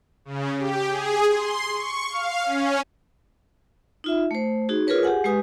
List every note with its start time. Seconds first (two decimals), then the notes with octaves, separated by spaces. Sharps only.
0.25 C#3
0.58 G4
0.88 G#4
1.31 C6
1.75 C#6
2.09 F5
2.43 C#4
4.04 D#4 F4 E5
4.31 A3 C5
4.69 D#4 F#4 G#4
4.87 F4 G#4 A#4 B4 C#5
5.03 G4 G#4 F#5 G#5
5.24 G#3 G4 B4 G#5 D#6